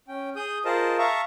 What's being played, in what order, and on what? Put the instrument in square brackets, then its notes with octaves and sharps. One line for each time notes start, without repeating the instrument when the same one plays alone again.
[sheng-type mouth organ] C#4 G5
G#4 D#6 G6
F4 G#4 A#4 C5 D#5 A5
E5 F5 A5 A#5 C#6